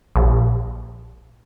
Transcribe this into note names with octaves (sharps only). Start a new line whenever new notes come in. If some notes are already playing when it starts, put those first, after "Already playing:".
A#1